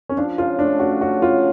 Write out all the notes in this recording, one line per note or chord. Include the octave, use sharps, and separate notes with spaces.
C#4
F3 D4
C#3 F4
A3 D4
C#3 F#4
C#3 F#4
C#3 F4